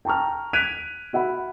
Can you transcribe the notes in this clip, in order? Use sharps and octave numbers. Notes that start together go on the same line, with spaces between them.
G5 A5 A#5 C#6 F6
F#6 G#6 B6 D7 D#7 F7
F#4 E5 F#5 B5